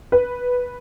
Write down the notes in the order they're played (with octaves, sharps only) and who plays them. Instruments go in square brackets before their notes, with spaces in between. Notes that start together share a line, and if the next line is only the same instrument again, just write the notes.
[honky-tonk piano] B4